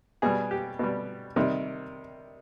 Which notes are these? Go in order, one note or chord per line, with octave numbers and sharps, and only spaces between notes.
B2 G3 G#4
G4
B2 G3
C3 D#3 G3